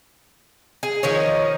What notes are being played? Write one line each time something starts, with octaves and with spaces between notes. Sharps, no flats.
G#4
D#3 F3 D#4 C#5